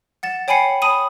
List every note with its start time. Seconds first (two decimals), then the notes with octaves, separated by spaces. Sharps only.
0.23 F#5 A6 E7
0.48 C#5 G5 G#5 B5 C7 C#7
0.82 C#5 A5 B5 D#6 D#7